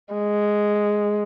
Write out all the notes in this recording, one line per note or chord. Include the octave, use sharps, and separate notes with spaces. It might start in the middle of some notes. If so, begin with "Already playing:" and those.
G#3